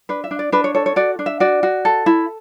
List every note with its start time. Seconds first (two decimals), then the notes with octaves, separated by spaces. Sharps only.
0.09 D4 B4
0.24 E5
0.31 D4
0.39 D5
0.52 D4 B4
0.64 C#5
0.75 A4 C#5
0.86 C#5
0.96 F#4 D5
1.19 D4
1.26 E5
1.40 F#4 D5
1.63 F#4
1.85 A4
2.06 E4